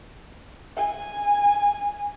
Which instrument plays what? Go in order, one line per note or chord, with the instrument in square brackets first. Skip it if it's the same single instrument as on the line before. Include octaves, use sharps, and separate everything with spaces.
[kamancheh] G#5